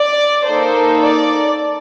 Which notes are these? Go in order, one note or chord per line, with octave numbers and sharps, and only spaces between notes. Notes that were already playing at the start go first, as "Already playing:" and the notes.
Already playing: D5
A#3 D#4 A4 C5
D5